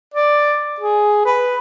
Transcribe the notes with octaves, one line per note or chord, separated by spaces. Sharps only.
D5
G#4
B4